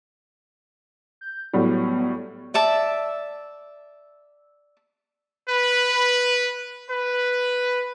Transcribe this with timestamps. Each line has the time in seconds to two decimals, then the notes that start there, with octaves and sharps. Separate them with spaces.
1.21 G6
1.53 A2 F#3 G3 B3
2.54 D5 E5 A5
5.50 B4
6.90 B4